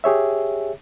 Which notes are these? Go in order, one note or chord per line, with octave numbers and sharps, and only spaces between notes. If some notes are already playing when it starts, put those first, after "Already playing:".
G4 G#4 C#5 E5